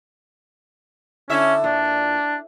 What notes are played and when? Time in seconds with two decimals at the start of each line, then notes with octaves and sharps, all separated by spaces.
1.30 D3 C#4 E4 E5
1.64 A#2 D4